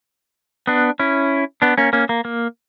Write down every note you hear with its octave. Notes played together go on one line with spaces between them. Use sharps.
B3 D4
C#4 E4
B3 D4
A#3 C#4
A#3 C#4
A#3
A#3